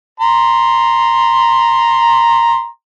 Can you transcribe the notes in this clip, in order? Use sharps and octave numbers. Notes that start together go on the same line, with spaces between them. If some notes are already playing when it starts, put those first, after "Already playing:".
A#5 C6